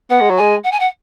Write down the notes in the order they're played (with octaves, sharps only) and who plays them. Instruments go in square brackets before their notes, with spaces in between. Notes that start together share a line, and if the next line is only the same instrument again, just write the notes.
[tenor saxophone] B3 [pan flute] F#5
[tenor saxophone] G#3
F#3
[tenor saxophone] G#3 [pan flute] G#5
[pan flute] F#5
G#5
F#5